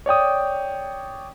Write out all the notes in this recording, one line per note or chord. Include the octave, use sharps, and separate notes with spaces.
C#5 D5 G5 D#6